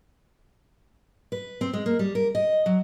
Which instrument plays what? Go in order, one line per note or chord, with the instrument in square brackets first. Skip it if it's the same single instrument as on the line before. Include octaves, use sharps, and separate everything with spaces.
[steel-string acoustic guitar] B4
C4
G#3
A#3
G3
A#4
D#5
F#3